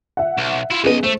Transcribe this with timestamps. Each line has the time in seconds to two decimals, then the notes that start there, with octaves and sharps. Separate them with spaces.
0.17 E5 F#5
0.38 B1
0.71 E4 F4
0.84 B1 B3 C#4 G#4 D#5
1.04 A3 C5